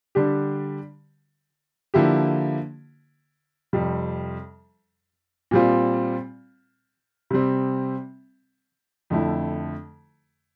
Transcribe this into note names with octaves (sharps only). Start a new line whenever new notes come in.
D3 G3 D4 G4
D3 F3 A#3 E4 G4
F2 C3 G3
A#2 G3 C4 F4
C3 G3 C4
F2 D3 A3 E4